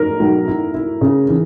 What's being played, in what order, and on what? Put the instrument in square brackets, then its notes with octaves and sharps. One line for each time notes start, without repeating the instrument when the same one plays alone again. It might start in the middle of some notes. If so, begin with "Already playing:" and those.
Already playing: [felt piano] A#4
[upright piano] B1
E4
E4
C#3
E3